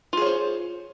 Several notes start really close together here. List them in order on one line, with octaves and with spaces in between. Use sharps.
F4 G#4 C#5 C5